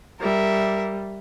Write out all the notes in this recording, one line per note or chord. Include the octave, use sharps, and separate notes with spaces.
G3 A#4 E5